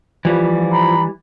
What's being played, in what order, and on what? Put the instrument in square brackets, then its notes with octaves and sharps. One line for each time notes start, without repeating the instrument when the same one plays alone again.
[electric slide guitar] E3 G3 [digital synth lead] F3
[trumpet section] A#5 B5